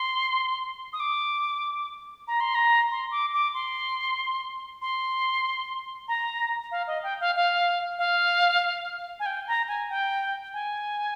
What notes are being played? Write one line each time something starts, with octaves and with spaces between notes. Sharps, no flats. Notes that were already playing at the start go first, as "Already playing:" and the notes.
Already playing: C6
D#6
D6
A#5
C6
A#5
C6
D6
D6
C6
C6
A#5
F5
D#5
G5
F5
F5
F5
G#5
G5
A#5
G#5
G5
G#5